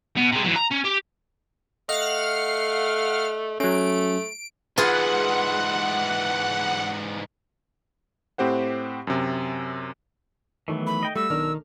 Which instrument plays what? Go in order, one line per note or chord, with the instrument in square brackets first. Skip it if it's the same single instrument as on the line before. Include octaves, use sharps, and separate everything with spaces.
[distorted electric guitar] B2
C3 G#3
E3 F#3
A#5
C#4
G4
[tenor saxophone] A3 [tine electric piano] D#5 [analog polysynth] F5 F#5 F6
[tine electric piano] F#3 C#4 [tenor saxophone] A3 [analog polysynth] D7
[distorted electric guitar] G#2 E3 [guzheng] F4 G#4 [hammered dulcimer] B4 [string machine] F#5
[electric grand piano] A2 C4 G4 C5 F#5
F#2 C3
[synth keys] D#3 A3 [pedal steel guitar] E3 F#3 B3
[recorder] B5
[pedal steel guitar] D#5 G5
[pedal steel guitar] G3 F#4 [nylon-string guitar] A3 [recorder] E6
[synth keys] B1 D4 F6 [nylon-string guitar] D#3 [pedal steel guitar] A#4